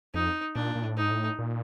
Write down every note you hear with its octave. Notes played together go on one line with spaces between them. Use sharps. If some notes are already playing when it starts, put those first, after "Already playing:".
F2 D#4
A#2 D4
A#2
A2
G#2 D#4
A2
A#2